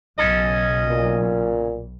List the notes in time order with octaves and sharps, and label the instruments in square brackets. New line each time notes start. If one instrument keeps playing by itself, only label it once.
[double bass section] B1 [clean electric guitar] C#3 C#4 A4 [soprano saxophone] D#5
[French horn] A#2